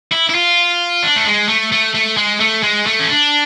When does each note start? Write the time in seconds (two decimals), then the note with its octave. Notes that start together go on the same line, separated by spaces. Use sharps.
0.11 E4
0.29 E4
0.35 F4
1.03 D4
1.16 A3
1.26 G#3
1.48 A3
1.72 A3
1.94 A3
2.17 G#3
2.40 A3
2.63 G#3
2.86 A3
2.99 C#4
3.09 D4